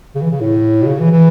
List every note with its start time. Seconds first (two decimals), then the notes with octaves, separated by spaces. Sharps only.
0.15 C#3
0.21 E3
0.31 C#3
0.41 A2
0.82 B2
0.87 C#3
0.99 E3
1.11 E3